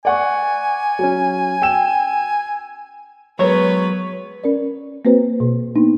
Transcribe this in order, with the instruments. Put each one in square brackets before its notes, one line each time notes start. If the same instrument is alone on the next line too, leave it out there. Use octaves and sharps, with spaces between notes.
[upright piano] D5 F#5 C#6 [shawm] G#5
[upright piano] F#3 C#4
G5 E6 E7
[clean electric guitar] F#3 G#3 A#4 [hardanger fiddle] B3 B4 [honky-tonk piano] C#5
[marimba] C#4 A#4 D5
A#3 C4 F#4 B4 C5
B2
A#3 B3 D4 D#4